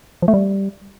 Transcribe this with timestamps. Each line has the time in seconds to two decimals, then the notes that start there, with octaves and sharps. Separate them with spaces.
0.22 F3
0.28 A3
0.34 G3